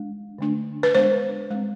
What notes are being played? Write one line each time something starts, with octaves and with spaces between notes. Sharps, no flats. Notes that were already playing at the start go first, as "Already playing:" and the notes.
Already playing: G#3 D4
D3 A3 D4
B4
G#3 B3 D4 C5
G#3 C4